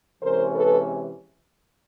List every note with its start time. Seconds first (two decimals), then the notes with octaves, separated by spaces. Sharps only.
0.22 C3 E3 G#3 C#4 A#4 C5
0.54 A4 B4